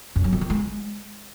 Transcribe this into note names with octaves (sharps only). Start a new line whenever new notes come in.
F#2
F#3
E3
D#3
G#3